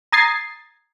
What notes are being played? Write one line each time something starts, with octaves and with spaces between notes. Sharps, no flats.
A#5 D#6 G#6 A6 C7